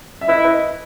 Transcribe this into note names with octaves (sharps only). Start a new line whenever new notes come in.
E5
E4 B4 D#5
B4 D#5